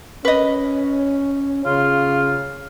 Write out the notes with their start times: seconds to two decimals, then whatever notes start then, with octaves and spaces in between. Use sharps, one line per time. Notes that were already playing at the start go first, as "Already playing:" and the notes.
0.25 C#4 B4 D#5
1.66 C#3 F4